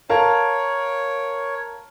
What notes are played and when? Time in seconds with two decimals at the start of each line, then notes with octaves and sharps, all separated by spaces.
0.09 A#4 C#5 F5 A5